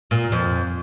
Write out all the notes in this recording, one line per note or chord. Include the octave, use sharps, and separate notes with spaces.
A#2
F2